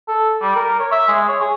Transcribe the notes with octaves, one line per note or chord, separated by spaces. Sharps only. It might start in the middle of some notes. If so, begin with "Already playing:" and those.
A4
G3
A#4
C#5
E5
G#3
C#5
G#4